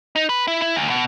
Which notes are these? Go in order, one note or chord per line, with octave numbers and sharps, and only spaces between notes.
D#4
B4
E4
E4
D2
B2